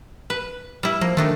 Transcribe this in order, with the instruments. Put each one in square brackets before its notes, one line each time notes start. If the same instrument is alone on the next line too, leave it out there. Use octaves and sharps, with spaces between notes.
[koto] B4
G3 E4
[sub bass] F3 [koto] A#3
[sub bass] D#3 [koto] A3 D4 D#4